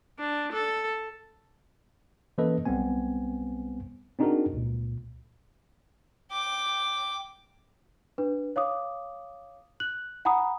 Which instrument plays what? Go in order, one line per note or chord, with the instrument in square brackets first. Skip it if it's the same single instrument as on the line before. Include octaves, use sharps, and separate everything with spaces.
[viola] D4
A4
[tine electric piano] E3 A#3 C#4 A4 B4 D#5
B1 G3 B3 C4 G#5
C4 D4 D#4 F#4 G#4 A#4
C#2 A#2
[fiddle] G5 D6
[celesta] D4 B4
C#5 F5 D6 D#6
F#6 F#7
F#5 G#5 A#5 B5 D#6